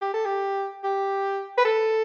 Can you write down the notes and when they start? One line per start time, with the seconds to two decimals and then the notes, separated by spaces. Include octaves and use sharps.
0.02 G4
0.14 A4
0.25 G4
0.84 G4
1.58 B4
1.65 A4